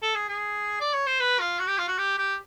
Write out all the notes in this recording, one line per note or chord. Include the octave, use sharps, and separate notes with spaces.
A4
G#4
G#4
D5
C#5
C5
B4
F4
F#4
G4
F4
F#4
G4
G4